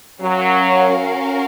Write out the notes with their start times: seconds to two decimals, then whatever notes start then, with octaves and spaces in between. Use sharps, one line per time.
0.21 F#3 C#4 F#4 A#4 F5